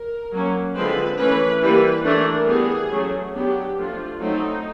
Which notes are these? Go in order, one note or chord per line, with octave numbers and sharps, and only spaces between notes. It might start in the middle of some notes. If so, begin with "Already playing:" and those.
Already playing: A#4
F#3 A#3 C#4
D3 F3 G#3 C4 B4
E3 A3 C#4 B4
E3 G3 A#3 B4
E3 A3 D4 A#4
E3 G3 B3 G#4
F#3 A3 C#4
F#3 B3 D4 G4
F3 A3 D4 F4
F#3 A3 C4 D#4